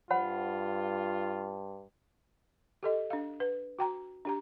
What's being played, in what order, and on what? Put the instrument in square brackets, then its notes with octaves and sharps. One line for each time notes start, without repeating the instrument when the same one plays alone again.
[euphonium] G2 [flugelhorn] F4 [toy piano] C5 F#5 B5
[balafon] G4 A4 D#5
D4 F5
B4
F#4 G5 A#5
D4 G4 A#5